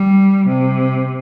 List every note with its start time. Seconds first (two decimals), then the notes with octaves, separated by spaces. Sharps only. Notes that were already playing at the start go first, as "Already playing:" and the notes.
Already playing: G3
0.48 C3